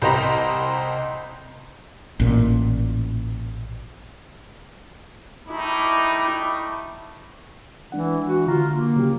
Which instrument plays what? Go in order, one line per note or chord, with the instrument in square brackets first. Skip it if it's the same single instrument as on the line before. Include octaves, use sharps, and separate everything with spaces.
[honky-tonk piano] C2 G4 C5 D#5 A#5 B5
[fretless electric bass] A1 A#2
[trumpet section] G3 A3 D6 [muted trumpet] D#4 [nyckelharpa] E4
[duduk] E3 [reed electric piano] G#3 D4 F#5
[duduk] F#4
[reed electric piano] D3 A#5 [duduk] F4
[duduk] A#3
[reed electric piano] C#3 F#3 G4